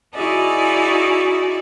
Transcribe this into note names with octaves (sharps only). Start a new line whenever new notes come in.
D#4 E4 F#4 G#4 D5